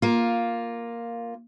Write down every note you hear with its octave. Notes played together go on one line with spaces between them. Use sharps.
A#3 F4